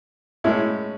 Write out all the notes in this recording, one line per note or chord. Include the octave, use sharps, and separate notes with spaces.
A2 G#3 C#4 E4